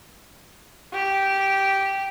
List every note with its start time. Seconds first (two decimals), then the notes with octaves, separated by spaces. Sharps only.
0.94 G4